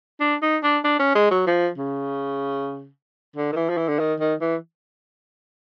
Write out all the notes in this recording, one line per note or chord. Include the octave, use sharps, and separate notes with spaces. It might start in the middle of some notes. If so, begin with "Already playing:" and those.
D4
D#4
D4
D4
C#4
G#3
F#3
F3
C#3
D3
D#3
E3
F3
E3
D3
D#3
D#3
E3